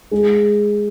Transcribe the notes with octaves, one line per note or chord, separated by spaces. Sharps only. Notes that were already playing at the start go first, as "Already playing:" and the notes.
G#3